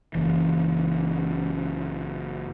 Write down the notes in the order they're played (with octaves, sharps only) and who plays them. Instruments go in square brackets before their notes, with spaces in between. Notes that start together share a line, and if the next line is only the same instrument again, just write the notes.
[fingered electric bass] F#1 E3